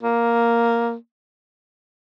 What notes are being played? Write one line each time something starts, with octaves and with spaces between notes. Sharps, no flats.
A#3